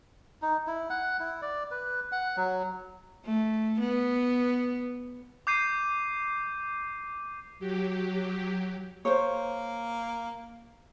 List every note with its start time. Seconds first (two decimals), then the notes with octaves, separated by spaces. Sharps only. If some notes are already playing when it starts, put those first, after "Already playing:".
0.42 D#4
0.67 E4
0.90 F#5
1.20 E4
1.42 D5
1.71 B4
2.12 F#5
2.37 F#3
3.26 A3
3.80 B3
5.47 D6 G6 C7 D#7
7.59 F#3 G4
9.05 A#3 C5 C#5